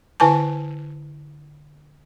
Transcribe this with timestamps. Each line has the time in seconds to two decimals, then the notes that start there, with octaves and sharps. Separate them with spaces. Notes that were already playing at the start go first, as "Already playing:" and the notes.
0.20 D3 E4 B4 G#5 A5